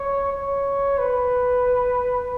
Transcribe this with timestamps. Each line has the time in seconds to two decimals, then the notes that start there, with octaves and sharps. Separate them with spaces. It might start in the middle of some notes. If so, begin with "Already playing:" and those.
Already playing: C#5
0.32 C#5
0.98 B4